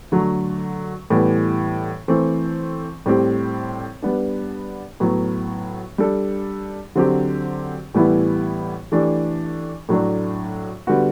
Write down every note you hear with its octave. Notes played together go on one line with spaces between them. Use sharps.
D3 F#3 A3
A2 E3 G3 B3
E3 A3 C4
A2 G3 C4 G4
G3 B3 D4
A2 F#3 B3
G3 D4 A4
D3 F#3 C4 G4
A2 E3 G3 B3 E4
E3 A3 D4 G4
A2 F#3 A3 D4
D3 G3 B3 F#4